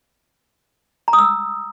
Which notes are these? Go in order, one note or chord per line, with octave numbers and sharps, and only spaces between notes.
A#5
D#6
E6